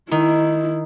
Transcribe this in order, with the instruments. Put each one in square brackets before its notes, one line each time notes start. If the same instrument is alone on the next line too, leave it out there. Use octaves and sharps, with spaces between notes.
[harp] D#3 [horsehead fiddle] E4